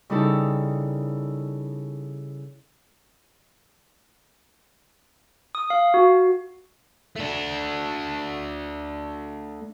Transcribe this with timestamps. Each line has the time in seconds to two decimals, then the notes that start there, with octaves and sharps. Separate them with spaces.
0.10 C#3 G3 D#4 E4 A4 A#4
5.55 D#6
5.70 F5
5.94 F#4
7.16 A3 D4